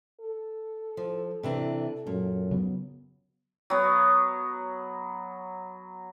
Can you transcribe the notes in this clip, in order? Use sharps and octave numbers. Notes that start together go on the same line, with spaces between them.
A4
F3
C3 E3 D4
F#2 A#2
C#3 F#3 B3
F#3 B3